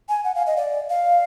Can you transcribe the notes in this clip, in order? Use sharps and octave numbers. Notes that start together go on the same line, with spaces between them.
G#5
F#5
F5
D#5
D5
F5